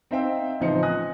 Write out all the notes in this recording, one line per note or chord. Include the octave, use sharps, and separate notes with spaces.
C4 D#4 C5 E5 F5 G5
A1 C#3 F3 D#4 C5 C#7
G#5 D#6 F#6 A#6